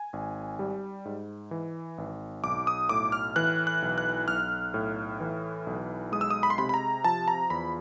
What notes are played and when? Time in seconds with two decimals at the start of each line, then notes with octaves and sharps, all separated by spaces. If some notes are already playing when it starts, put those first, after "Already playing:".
Already playing: G#5
0.13 G#1
0.59 G3
1.05 G#2
1.51 E3
1.98 G#1
2.43 B1 D6
2.67 D#6
2.89 A2 D6
3.12 F6
3.36 E3 F#6
3.67 F#6
3.82 B1
3.98 F#6
4.28 B1 F6
4.74 A2
5.20 E3
5.67 B1
6.12 G#3 D#6
6.21 E6
6.30 D#6
6.43 B5
6.50 C6
6.58 C3 B5
6.69 B5
6.74 A#5
7.04 F3 A5
7.28 A#5
7.50 E2 B5